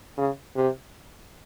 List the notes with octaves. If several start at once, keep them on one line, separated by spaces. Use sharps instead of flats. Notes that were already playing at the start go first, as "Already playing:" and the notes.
C#3
C3